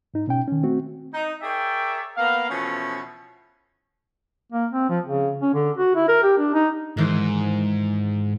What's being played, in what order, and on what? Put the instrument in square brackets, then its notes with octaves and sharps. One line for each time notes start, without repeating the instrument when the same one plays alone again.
[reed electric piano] G#2 D#4
B2 C#4 G5
D#3 C#4
A3 C4 F#4
[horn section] D#4
G#4 A#4 C#5 D5 E5 G5
A#3 B3 A#4 F5
B2 E3 F3 A3 C#4
[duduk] A#3
C4
F3
C#3
C#4
D3
F#4
E4
A#4
G4
D4
D#4
[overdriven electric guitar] G#2 [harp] D#3 E3 C5